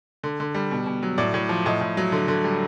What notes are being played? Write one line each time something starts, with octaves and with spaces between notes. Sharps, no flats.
D3
D3
G3
B2
B2
F#3
A2 D5
A2
F3
A2 D#5
A2
F#3
D3
D3
G3